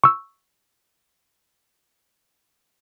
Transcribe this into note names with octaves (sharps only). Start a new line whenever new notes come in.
C#6 E6